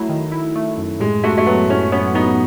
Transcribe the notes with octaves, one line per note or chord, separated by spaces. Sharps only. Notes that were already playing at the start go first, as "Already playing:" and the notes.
Already playing: F#3 A3 E4
D#3
E4
A3
F#2
A2 G#3
A3 F#4
A3
F#3 B3
A2 C#4
B3 C#4
B3 D#4